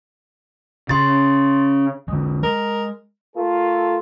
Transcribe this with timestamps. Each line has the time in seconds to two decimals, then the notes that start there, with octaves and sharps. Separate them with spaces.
0.89 C#3 C6 A6
2.08 D3 G#3
2.43 G#3 A#4
3.36 A3 F4 A4 A#4